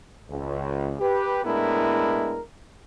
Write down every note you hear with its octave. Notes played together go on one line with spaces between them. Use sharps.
C#2
G4 B4
A2 G#3 B3 D4 E4 A#4